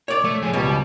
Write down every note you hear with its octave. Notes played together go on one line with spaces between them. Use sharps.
C#5 D5
A3
F2 G#4
C#2 B2 G3